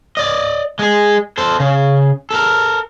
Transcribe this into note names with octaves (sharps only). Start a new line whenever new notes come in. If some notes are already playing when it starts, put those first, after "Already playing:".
D5 D#5
G#3 G#4
A4 C5
C#3
A4 A#4